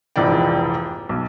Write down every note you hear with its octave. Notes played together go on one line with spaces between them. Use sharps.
F1 A#1 G#2 E3 D5 G5
B1